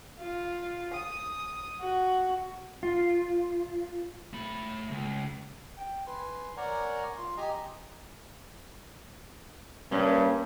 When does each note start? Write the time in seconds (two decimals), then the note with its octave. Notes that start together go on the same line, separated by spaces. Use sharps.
0.19 F4
0.93 D#6
1.80 F#4
2.83 F4
4.33 A3 B5
4.91 C#2
5.77 G5
6.07 B4 G#5 C6
6.57 A#4 C#5 D5 F#5 G#5 A#5
7.17 F4 C6
7.37 G4 D#5 G#5 A#5 D#6
9.92 G2 A#3 C#4